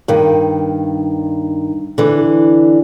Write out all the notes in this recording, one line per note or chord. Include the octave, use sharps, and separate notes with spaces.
G2 D#3
D3 E3